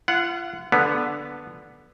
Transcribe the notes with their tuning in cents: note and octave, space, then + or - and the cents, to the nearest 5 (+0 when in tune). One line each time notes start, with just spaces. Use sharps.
F4 -35 F#5 +0
D3 +0 B3 -5